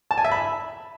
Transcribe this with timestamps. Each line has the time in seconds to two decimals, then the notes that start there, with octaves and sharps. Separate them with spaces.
0.11 A5
0.18 G#5
0.25 E5
0.32 B5